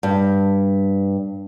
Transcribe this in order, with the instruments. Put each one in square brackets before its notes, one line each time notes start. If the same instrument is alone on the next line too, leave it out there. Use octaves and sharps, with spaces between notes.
[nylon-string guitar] G2